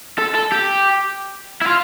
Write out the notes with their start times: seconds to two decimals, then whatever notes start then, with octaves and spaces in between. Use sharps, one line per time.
0.18 A4
0.35 A4
0.52 G4
1.62 E4
1.66 F4